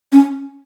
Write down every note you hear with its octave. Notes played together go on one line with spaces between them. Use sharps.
C#4